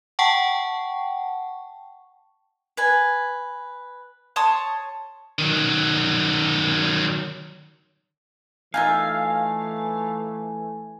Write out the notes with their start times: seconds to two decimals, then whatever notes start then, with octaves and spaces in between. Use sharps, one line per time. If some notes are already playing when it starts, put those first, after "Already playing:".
0.19 F#5 G5 A5 C#6
2.77 B4 G#5
4.36 C#5 A5 C6 D#6
5.39 D#3 F#3
8.74 E3 A3 D#4 F4 E5 F5 G#5